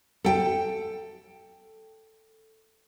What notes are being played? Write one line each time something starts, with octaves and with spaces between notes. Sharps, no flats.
A4 G5